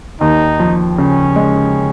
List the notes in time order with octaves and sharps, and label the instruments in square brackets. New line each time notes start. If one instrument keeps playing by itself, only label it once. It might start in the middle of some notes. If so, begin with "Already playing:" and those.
[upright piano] D#2 [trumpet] D#4
[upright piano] F3
[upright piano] C#3 [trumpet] C#4
[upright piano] G#3